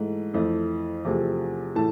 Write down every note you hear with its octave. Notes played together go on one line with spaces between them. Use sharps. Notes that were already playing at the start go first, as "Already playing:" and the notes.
Already playing: G#2 E3 A3
F2 E3 A3
E2 C3 F3 A3
A2 E3 A3 A5